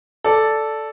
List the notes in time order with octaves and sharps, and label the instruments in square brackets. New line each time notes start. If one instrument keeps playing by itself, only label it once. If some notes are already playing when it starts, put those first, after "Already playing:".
[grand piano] A4 D5